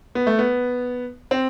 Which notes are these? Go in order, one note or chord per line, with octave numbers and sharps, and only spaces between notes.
B3
A3
B3
C4